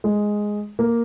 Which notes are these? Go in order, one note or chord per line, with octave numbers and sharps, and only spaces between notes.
G#3
A#3